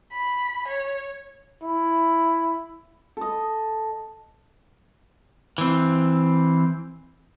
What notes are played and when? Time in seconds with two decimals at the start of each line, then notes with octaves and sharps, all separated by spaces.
0.13 B5
0.68 C#5
1.62 E4
3.17 A4 D#5
5.58 E3 C4